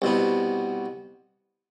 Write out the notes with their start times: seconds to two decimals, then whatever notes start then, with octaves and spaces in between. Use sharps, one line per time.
0.02 C2 B2 B3